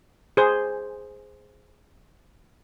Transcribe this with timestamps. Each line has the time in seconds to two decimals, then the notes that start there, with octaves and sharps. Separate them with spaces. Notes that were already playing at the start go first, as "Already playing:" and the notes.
0.37 G#4 C5